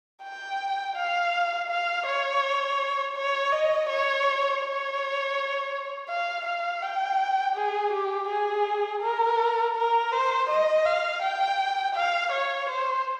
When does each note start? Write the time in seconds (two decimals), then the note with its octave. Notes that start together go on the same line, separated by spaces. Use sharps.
0.22 G5
0.95 F5
1.68 F5
2.06 C#5
3.16 C#5
3.52 D#5
3.89 C#5
4.62 C#5
6.09 F5
6.45 F5
6.82 G5
7.55 G#4
7.93 G4
8.29 G#4
9.02 A#4
9.76 A#4
10.12 C5
10.49 D#5
10.85 F5
11.22 G5
11.95 F5
12.32 C#5
12.69 C5